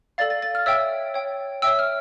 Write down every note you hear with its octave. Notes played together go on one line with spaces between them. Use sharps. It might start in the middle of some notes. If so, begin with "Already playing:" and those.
A4 D5 F5 A6
A6
A6
F6
C#5 E5 G5 E6
C#5 G5
C#5 E5 G5 E6
F6